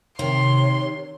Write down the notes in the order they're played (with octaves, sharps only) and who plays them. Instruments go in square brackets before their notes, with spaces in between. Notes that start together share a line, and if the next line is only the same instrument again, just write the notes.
[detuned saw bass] C3 [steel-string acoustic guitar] D#3 [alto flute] C#5 [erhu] C6